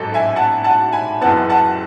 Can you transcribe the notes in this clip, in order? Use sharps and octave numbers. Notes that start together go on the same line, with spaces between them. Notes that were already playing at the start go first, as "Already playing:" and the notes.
Already playing: A1 G#2 F#3 A4
E5 G#5
F#5 A5
F#5 A5
G#5 B5
F#1 F#2 E3 B3 F#5 A5
F#5 A5